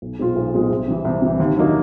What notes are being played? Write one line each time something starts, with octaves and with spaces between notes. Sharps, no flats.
B1
B2 G#3 C4 F4
B1
B2 G#3 C4 F4
C2
C3 E3
C2
C3 E3
D#2
D3 F#3 A#3 D#4